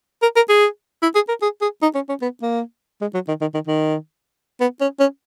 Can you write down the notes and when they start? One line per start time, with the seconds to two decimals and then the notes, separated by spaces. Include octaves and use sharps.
0.22 A#4
0.36 A#4
0.49 G#4
1.02 E4
1.15 G#4
1.28 A#4
1.42 G#4
1.61 G#4
1.82 D#4
1.95 C#4
2.09 C#4
2.22 B3
2.42 A#3
3.01 G#3
3.14 F#3
3.28 D#3
3.41 D#3
3.54 D#3
3.67 D#3
4.60 B3
4.81 C#4
5.00 C#4